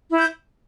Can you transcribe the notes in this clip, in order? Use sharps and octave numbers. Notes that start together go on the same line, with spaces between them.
E4
G6